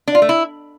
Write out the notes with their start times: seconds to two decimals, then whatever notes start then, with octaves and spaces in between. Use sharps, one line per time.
0.08 D4
0.15 F4
0.22 A3
0.29 E4